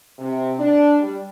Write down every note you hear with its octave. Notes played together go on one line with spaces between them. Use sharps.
C3
D4
G3